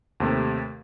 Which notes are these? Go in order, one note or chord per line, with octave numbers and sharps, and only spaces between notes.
D#2 C3 A3